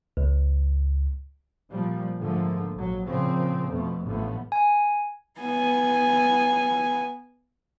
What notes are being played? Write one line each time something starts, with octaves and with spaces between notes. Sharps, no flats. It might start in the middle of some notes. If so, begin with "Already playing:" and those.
C#2
A#2 F3 G3
G#2 D3 F3 A3 A#3
A#1 F#3
A#2 C#3 F3 C4
F2 B2 A3
A1 A2 D3 F3 A3 B3
G#5
B3 G#5